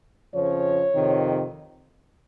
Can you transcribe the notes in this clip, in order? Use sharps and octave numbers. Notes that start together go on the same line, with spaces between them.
F2 C#3 F3 C#5
F2 C3 D#3